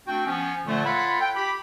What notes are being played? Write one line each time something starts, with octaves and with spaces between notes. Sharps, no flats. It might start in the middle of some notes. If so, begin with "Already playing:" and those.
A3 C4 D4 F#4 G5
F3 B3 C#4
A#2 D3 F3 A3
F4 A4 C#5 F5 F#5 B5
G5
G4 B5